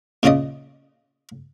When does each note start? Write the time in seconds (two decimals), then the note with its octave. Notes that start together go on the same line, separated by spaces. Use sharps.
0.23 A#2 C#3 C#4 F4 D5 D#5